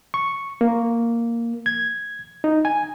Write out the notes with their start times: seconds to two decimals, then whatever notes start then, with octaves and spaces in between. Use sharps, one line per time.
0.14 C#6
0.61 A#3
1.66 G#6
2.44 D#4
2.65 G#5